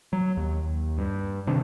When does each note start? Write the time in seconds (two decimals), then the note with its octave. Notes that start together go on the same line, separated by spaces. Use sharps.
0.13 F#3
0.37 D#2
0.98 G2
1.47 C3 D#3 D4